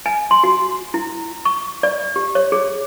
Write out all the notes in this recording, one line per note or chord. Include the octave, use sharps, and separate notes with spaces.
G#5
C6
F#4
E4
C#6
D5
G4
C#5
G#4